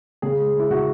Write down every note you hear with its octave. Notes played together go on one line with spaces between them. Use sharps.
C#3 G#4
G#3
G#3
E4
C#3 F#4